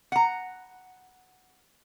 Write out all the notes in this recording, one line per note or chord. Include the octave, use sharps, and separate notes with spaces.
F#5 A#5